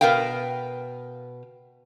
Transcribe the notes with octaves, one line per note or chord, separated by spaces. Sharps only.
B2 A#4 B4 F5 G5